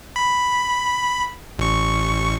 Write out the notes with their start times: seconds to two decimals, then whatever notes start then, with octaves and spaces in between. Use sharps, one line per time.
0.16 B5
1.59 A1 C#6